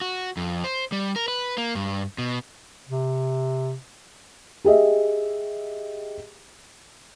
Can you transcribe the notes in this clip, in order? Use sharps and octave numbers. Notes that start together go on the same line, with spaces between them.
F#4
F2
C5
G3
A#4
B4
A#3
G2
B2
C3
G4 G#4 D#5 E5